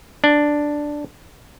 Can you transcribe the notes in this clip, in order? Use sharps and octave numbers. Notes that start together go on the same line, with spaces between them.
D4